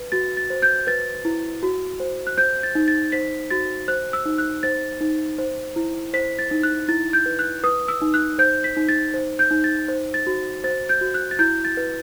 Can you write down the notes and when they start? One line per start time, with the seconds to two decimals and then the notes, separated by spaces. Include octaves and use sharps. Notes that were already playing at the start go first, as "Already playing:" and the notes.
Already playing: B4
0.12 F#4 A6
0.37 A6
0.50 C5
0.62 G6
0.87 B4 A6
1.25 E4
1.63 F#4
2.00 C5
2.27 F#6
2.38 C5 G6
2.63 A6
2.75 D#4
2.88 A6
3.12 C5 B6
3.50 F#4 A6
3.88 C5 F#6
4.13 E6
4.26 D#4
4.38 F#6
4.63 C5 A6
5.01 D#4
5.38 C5
5.76 E4
6.14 C5 B6
6.39 A6
6.51 D#4
6.63 F#6
6.88 E4 A6
7.13 G6
7.26 B4
7.39 F#6
7.64 B4 D#6
7.88 E6
8.02 D#4
8.14 F#6
8.39 C5 G6
8.64 B6
8.77 D#4
8.89 A6
9.14 C5
9.39 G6
9.51 D#4
9.64 A6
9.88 C5
10.14 A6
10.27 F#4
10.64 C5 A6
10.89 G6
11.01 F#4
11.14 F#6
11.31 A6
11.39 E4 G6
11.65 A6
11.77 B4